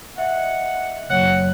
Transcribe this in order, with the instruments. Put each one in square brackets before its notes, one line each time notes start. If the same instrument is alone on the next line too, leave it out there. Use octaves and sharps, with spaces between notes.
[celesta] D#5 E5 [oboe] F#5
[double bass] F#1 [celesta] C#5 [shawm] F#5